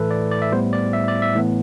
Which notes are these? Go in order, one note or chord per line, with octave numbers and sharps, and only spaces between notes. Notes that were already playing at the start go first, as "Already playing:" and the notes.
Already playing: A2 E3 A3 A4 B4
D5
D5
E5
A2 G3 B3 E4 C5
D5
E5
D5
E5
A2 E3 B3